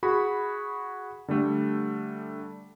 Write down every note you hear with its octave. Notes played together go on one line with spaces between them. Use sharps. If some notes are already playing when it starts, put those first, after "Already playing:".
F#4 G#4 B5
D3 G3 A3